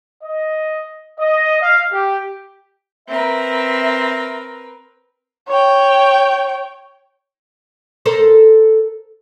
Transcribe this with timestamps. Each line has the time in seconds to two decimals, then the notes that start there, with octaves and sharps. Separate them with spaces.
0.23 D#5
1.20 D#5
1.61 F5
1.92 G4
3.08 C4 A#4 B4 E5
5.48 C#5 G5
8.06 A4 A#4 C5